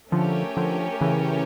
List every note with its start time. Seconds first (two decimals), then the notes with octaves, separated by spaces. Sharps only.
0.12 D3 F3 A3 C#4 G4 A#4
0.57 D3 F3
1.01 C#3 E3